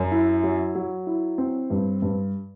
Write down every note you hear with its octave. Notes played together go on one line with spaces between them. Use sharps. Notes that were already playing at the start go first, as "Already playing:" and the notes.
Already playing: F#2
E4
F#3
F#3
E4
C4
G2
G2